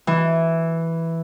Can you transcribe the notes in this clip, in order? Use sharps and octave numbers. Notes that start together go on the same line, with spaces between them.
E3